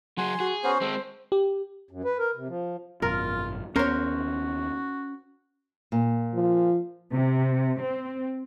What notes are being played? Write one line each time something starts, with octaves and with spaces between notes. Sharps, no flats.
F#3 G#4 F#5 G#5 C6
F#4 G#4
B3 C#4 F#4 C5
G#3 C4 A4
G4
F#2
B4
A#4
C3
F3
G#1 F#2 B2 F4 A#4
D#2 B3 C#4 F#4 A#4 C5 C#5
A#2
F3
C3
C4